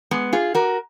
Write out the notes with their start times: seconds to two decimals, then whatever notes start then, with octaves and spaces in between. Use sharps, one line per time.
0.11 G#3 B3
0.33 F4 G#4
0.55 F#4 A#4